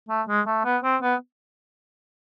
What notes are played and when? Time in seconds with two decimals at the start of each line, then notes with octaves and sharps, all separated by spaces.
0.09 A3
0.28 G#3
0.46 A3
0.65 B3
0.83 C4
1.02 B3